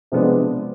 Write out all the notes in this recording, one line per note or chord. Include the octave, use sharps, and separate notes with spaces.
C3 F3 G#3 B3 D4